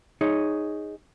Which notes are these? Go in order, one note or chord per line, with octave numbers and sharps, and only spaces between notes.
D#4 G#4 C#5